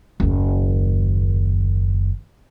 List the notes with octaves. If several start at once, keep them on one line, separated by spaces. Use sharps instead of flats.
F#1 D#2